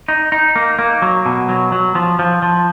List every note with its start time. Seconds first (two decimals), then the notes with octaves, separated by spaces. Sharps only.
0.08 D#4
0.32 D#4
0.56 A#3
0.79 A#3
1.02 F#3
1.26 B2
1.49 F#3
1.72 F#3
1.95 F3
2.19 F3
2.42 F3